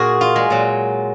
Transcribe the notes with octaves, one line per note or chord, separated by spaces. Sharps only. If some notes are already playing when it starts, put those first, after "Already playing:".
Already playing: A#2 F#4 G#4 A#4
F4
G#3
A#2 F#3